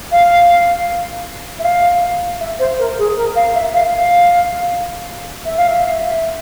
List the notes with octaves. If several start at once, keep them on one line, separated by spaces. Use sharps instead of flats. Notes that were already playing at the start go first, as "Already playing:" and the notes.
F5
E5
F5
E5
C5
A#4
G#4
A#4
F5
E5
F5
F5
E5
F5
E5